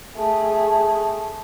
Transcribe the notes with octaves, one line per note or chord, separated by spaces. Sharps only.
A3 G#4